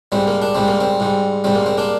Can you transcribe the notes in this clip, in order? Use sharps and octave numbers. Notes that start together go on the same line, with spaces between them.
G#2 G3 C4
A#3
D4
G#2 G3 C4
A#3
C4
G#2 G3
G#2 G3 C4
A#3
C4
A#3 D4